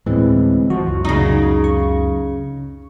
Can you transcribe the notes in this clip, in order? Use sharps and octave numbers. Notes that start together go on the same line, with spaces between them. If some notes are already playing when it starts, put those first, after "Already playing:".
D2 A2 E3 G#3 B3 C4
F3 F#4
C#2 F#2
C#3 D#4
C#6